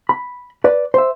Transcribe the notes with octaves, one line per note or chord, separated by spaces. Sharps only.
B5
B4 D5
C5 E5